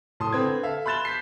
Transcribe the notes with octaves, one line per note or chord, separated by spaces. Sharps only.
A2 A5 C6 D#6
D3 C4 B4 G#6
A4 E5 F5
B5 C6 F#6 A6 E7 G7
G6 B6 C7